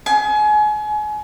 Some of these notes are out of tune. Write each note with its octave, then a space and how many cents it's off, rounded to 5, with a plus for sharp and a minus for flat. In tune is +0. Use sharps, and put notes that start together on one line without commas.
G#5 +30